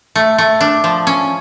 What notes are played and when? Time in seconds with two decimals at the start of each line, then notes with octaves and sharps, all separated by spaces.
0.16 A3
0.38 A3
0.61 D4
0.84 F3
1.07 C#4